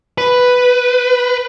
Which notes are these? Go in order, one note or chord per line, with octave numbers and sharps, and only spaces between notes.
B4